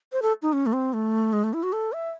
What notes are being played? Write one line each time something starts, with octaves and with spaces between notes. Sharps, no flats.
C5
A4
D#4
C#4
A3
C4
A3
G#3
A3
E4
F#4
A4
E5